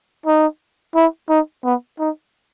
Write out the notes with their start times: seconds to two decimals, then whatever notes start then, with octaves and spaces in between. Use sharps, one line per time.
0.26 D#4
0.95 E4
1.29 D#4
1.64 B3
1.99 D#4